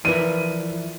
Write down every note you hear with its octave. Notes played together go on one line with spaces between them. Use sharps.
E3 F3 E4 A#4 B4 D5 D#7